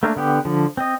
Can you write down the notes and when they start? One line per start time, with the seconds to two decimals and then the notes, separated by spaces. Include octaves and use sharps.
0.03 A3 A#3 D4 A#4
0.16 D3 B3 G4
0.45 D3 F3
0.77 C4 D#5